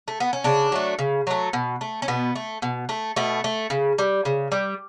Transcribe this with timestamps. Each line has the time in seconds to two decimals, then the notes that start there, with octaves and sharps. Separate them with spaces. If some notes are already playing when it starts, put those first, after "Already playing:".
0.08 A3
0.20 B3
0.33 C#4
0.44 C#3 D4
0.72 F#3 A3
0.99 C#3
1.27 F#3 A3
1.53 B2
1.81 A3
2.02 C#4
2.08 B2 B3
2.35 A3
2.62 B2
2.89 A3
3.16 B2 A3
3.44 A3
3.70 C#3
3.98 G3
4.25 C#3
4.52 G3